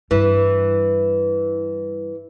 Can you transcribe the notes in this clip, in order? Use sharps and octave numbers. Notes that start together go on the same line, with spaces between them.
G2 E3 G3